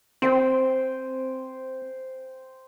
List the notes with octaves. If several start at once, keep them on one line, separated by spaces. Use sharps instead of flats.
C4 C5 G5 G#5